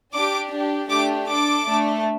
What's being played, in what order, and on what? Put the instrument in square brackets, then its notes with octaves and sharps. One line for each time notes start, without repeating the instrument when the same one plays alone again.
[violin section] D4 G4 D6
D4 G4
A3 D4 G4 D6
D4 A4 D6
A3 D4 A4